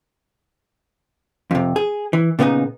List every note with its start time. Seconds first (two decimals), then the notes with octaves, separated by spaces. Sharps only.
1.51 F2 C3
1.76 G#4
2.13 E3
2.39 A#2 C#3 B3 D4 D#4